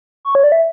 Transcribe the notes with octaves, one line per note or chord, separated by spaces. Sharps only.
C#6
C#5
D5
E5